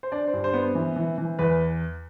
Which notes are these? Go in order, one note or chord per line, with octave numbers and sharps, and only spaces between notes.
C5
D4 D5
C5
G2
C5
B3
C5
E3
E3
E3
E2 B4